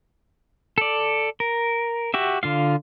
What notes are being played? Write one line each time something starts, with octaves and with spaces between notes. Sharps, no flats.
A4 D5
A#4
F#4 G4 E5
D3 F4 F5